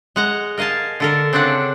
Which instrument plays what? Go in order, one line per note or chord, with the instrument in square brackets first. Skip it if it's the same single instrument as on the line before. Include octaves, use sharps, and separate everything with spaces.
[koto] G#3 F#5 A#5
A#4 D#5 F5 G#5 A5
D3 A4 A#4
C#3 C4 D4 D5 F#5